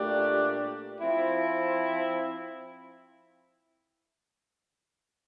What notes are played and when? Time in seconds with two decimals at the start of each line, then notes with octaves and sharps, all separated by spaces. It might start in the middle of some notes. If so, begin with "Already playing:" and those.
Already playing: A#2 A3 D4 G4
1.01 F3 C4 E4